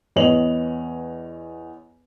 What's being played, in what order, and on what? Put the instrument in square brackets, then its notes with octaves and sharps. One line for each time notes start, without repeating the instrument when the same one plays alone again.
[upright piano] E2 B3 C#5 D#5 F7 F#7